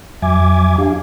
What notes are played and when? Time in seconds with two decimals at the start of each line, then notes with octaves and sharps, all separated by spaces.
0.22 F2 F#3 E5 G#5 D6 G#6
0.78 D4 G4 F5